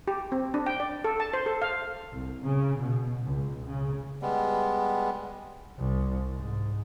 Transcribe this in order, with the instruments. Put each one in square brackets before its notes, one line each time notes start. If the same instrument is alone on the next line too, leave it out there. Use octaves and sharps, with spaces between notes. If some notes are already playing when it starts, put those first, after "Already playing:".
[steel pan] G4
C4
D4
G5
D5
A4
A5
C5
A4
F5
[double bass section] C2
C#3
B2
C#2
C#3
[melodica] G3 G#3 B3
[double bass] C2
G#2